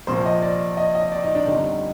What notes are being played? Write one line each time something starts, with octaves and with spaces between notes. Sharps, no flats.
A#1 A#2 F3 C5
D#5
D5
D#5
D#5
D5
D#4
D4
G1 F2 D3 G3 D#4